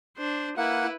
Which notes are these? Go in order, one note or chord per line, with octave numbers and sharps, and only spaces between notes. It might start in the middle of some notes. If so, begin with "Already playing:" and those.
D4 C5
A#3 E4 B4 F#5